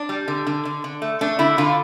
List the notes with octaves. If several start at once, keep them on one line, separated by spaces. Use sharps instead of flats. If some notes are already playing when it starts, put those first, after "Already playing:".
Already playing: D4
G3
D3
D3
D3
D3
A3
A3 D4
D3 E4
D3 F4